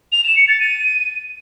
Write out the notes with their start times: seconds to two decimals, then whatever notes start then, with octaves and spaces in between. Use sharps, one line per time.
0.12 F7
0.24 E7
0.36 C#7
0.48 A6
0.60 D#7